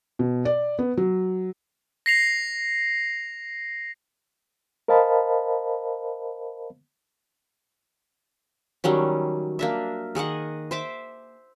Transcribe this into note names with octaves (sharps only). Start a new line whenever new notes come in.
B2
D5
B3
F#3
A#6 C7 F7
A#4 C5 D#5 F5 A5 B5
D#3 F#3 G3 C#4
A#3 D4 E5
D#3 G#4 D#5 F#5
C5 E5 D6